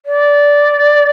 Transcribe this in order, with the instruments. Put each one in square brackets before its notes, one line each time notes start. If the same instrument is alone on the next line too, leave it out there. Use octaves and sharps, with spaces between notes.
[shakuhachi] D5